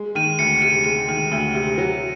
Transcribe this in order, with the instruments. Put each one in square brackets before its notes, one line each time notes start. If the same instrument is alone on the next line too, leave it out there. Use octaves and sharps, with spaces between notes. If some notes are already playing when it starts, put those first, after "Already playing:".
Already playing: [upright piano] G#3
[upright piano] D#3 [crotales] D#7
[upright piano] D2 [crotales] C#7
[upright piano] C3 [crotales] D#7
[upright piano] G#3 [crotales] D#7
[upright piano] D#3
D2
C3
F#3